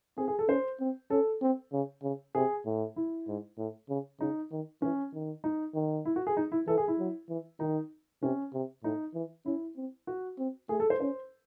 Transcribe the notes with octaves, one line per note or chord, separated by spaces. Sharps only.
C4 G#4
G#4
A4
C#4 C5
C4
C#4 A4
C4
C#3
C#3
C3 G#4
A2
E4
G#2
A2
C#3
C#3 D#4
D#3
E3 C#4
D#3
D#4
D#3
E4
F#4
G#4
D#4
E4
E3 A4
G#4
E4
F#3
E3
D#3 D#4
C3 C#4
C3
A2 D#4
E3
C#4 E4
C4
F#4
C4
A3 G#4
A4
C5
C#4 C5